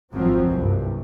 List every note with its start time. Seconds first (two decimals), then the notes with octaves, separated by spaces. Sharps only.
0.13 G#1 F2 F3 F#3 C4
0.51 F#1 C2 G2